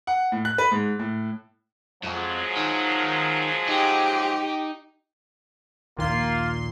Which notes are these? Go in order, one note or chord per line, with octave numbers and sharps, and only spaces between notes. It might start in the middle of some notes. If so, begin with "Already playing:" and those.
F#5
A2
F#6
B4
G#2
A2
F2 F3 F#3 G#3
D#3
D#4 G4
A#1 D#2 A#2 D#3 A#3 F4 C6